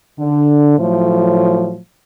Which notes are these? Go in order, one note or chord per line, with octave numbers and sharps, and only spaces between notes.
D3
A2 F3 F#3 A3